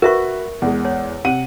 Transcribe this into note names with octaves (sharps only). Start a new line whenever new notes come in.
F#4 A#4 B4 E5 C#6
E2 G#3
C#5
C3 F#5 D#7